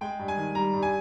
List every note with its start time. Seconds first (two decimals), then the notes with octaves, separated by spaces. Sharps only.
0.01 G#3 G5
0.19 G2
0.28 G#5
0.37 D#3
0.55 G3 A#5
0.74 G2
0.82 G#5